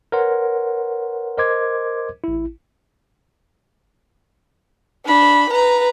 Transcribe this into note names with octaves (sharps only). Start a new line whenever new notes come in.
A#4 B4 C#5 F#5 C6
A#4 C5 D#5 C6 D6 G#6
A1 E4
D4 B5
B4 A#5